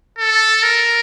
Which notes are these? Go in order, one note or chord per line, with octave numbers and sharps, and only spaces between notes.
A4
A#4